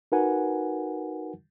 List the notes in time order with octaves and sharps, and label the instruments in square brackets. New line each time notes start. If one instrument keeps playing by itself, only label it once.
[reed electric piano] D#4 F#4 A#4 B4 F#5 G#5